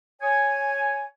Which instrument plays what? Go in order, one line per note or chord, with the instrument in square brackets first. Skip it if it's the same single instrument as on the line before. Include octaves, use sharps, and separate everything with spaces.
[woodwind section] C#5 G#5